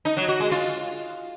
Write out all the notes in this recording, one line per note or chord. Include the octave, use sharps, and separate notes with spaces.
D#4
F#3
F#4
G#3
F4